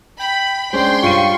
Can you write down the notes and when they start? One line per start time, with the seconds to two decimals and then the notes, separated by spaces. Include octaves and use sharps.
0.19 G5 B5
0.73 G#3 C#4 D4 C5 G5 C6
1.03 G2 F4 C#6 D#7